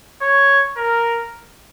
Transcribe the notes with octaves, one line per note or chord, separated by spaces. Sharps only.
C#5
A#4